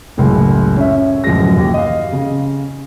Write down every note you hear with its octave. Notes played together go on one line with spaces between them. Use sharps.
F#1 C#2 A2
C#4 E5
D1 F#2 F3 G#3 A#6
D#2
D#5 F5
C#3